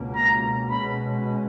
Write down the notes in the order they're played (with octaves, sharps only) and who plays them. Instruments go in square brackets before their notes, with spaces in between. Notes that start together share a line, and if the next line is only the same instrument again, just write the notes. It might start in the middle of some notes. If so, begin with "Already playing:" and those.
Already playing: [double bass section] C#2 B2 A#3 C#4
[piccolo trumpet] A#5
[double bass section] B2 G#3 C#4 [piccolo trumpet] B5